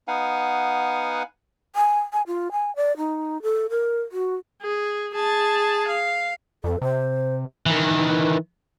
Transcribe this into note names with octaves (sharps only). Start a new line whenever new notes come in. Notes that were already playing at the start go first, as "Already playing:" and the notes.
B3 D#4 B4 F5 F#5 G#5
G#5
G#5
F4
G#5
D5
D#4
A4
A#4
F#4
G#4
G#4 A5
F5
F2 A4
C3 C5
D#3 E3